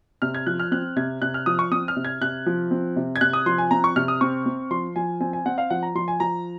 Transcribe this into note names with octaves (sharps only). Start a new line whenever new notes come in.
C3 F6
G#6
F3 F#6
F6
C4 F#6
C3 G#6
C3 F#6
F6
F3 D#6
C#6
C4 D#6
F6
C3
G#6
C3 F#6
F3
C4
C3
G#6
C3 F#6
D#6
F3 C6
G#5
C4 A#5
C#6
C3 F6
D#6
C4 C#6
C4
F3 C6
F3 G#5
C4 G#5
G#5
C4 F#5
F5
F3 F#5
A#5
F3 C6
G#5
F3 A#5